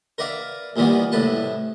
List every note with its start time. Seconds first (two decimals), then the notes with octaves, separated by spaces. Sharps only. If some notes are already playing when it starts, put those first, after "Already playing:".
0.18 A#4 B4 D5 E5 F5
0.76 D#2 A#2 D#3 E3 G3 B3
1.12 C2 A2 B4 A5